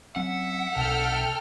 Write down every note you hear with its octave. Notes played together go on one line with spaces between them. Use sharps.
F#3 C4 C#4 E5 F#5
B1 C3 A4 G5 F6